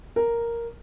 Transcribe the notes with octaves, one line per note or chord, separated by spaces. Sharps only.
A#4